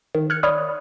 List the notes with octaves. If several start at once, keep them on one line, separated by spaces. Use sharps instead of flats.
D#3
F6 F#6 G#6 C#7
C#5 D5 B5 D#6 F6